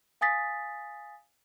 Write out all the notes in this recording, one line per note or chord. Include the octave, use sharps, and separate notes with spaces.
F5 G#5 D#6 A6 B6